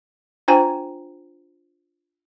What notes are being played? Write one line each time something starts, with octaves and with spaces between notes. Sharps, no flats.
D4 F4 C5 G5 G#5 A#5